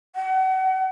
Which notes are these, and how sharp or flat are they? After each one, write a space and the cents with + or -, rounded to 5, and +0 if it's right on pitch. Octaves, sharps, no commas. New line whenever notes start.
F#5 +35